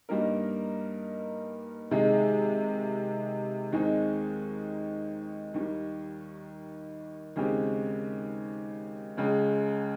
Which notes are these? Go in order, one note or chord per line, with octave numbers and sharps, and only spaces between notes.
G2 G3 A#3 D#4 A#4
C3 D#3 G#3 D#4 G#4
D#2 D#3 G#3 C4 D#4
D#2 D#3 G3
D#2 C#3 G#3 C4 G4
C#2 C#3 G#3